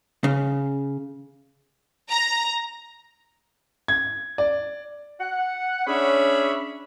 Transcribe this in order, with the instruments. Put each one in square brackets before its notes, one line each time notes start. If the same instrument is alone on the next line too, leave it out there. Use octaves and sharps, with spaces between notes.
[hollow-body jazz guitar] C#3
[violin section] A#5
[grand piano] G#6
D5
[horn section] F#5
C#4 D4 G#4 C#5 E5 B5